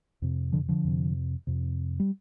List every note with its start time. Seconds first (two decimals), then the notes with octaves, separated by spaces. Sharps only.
0.22 F2 C3
0.52 D3 F3
0.68 D3 F3
0.84 F2 C3
1.47 F2 C3
2.00 G3